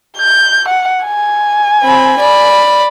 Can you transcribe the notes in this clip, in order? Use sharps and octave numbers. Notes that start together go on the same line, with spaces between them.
G6
F#5
G#5
C4 B5
D5 B5